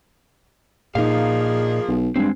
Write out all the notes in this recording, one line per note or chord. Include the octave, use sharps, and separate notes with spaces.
A#2 F3 A#3 D#4 G#4 F5
B1
G2 G#3 C4